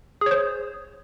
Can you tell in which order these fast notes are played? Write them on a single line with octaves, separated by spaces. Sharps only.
G#4 C#5 C5